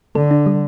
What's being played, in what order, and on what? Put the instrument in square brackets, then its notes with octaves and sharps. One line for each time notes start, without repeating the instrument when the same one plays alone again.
[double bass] D3 [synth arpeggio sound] A4
[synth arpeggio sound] D4
G3